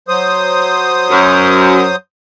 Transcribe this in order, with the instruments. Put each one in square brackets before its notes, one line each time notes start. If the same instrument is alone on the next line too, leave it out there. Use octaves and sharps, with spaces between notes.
[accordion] F#3 C5 D#6
[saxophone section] F#2